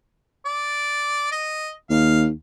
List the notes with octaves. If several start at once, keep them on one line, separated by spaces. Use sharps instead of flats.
D5
D#5
D#2 F5